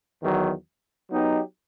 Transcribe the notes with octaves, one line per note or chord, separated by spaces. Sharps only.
E2 D#3 F#3
F#3 B3 D#4 G4